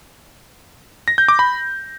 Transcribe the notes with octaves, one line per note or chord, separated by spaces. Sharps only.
A#6
G6
D6
B5